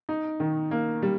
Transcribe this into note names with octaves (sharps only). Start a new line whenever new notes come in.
D#4
D#3
A#3
G3